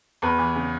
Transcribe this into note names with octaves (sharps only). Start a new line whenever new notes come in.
E2 B4
E3
C#3